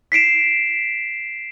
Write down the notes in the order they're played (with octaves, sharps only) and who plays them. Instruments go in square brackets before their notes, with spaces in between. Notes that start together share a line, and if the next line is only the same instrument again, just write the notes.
[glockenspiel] B6 C7 D7 E7